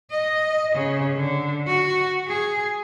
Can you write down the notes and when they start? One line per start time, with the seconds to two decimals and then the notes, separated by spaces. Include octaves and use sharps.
0.10 D#5
0.76 C#3
1.16 D3
1.67 F#4
2.27 G#4